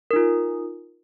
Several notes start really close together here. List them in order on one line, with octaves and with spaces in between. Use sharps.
A#4 D#4 F4